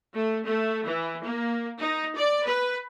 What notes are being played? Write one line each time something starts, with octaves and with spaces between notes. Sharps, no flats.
A3
A3
E3
A#3
D#4
D5
B4